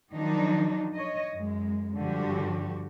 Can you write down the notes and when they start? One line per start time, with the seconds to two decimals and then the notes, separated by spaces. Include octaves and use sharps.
0.13 D#3 F3 F#3 D4 D#4
0.95 C#5 D#5
1.33 F#2 G#3
1.94 G2 D3 F3 F#4 G4